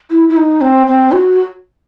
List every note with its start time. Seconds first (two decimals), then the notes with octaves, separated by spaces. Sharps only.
0.11 E4
0.29 E4
0.37 D#4
0.61 C4
0.87 C4
1.12 F#4